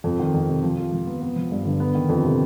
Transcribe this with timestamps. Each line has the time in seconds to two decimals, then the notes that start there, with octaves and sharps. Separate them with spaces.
0.04 F2
0.19 D#3
0.34 F2
0.48 C3
0.63 F3
0.77 F4
0.92 F3
1.07 B3
1.21 B3
1.36 F3
1.52 G2
1.65 D3
1.80 B3
1.95 D#3
2.09 F2
2.25 C3